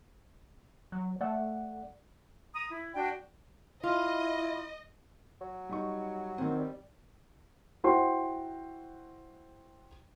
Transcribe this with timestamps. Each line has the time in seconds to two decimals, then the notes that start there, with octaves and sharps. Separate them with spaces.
0.92 F#3
1.21 A3 D5 F#5
2.54 A#5 D#6
2.69 E4
2.94 D4 F#4 D5 G5
3.83 E4 F4 D#5
5.41 F#3
5.69 G3 D#4 C#6
6.38 D#3 C4
6.59 G3
7.84 E4 F#4 C5 F#5 G5 C6